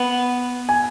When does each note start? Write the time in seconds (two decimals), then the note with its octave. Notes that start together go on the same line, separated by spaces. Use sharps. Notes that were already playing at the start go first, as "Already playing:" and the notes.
Already playing: B3
0.69 G#5